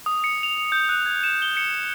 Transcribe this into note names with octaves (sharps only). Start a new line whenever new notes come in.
D#6
C#7
F7
G6
F#6
G#6
E7
G7
C#7